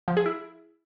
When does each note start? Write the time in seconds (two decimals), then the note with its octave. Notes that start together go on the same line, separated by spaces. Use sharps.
0.08 F3
0.17 G#4
0.26 E4